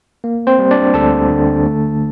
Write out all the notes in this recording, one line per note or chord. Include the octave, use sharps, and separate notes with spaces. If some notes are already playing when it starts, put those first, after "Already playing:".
A#3
C4 C5
G3
D4 D5
D2 A4 A5
D3
A3